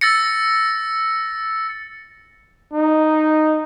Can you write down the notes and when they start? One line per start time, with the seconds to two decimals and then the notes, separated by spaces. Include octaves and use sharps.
0.01 E6 A6 A#6 C#7
2.73 D#4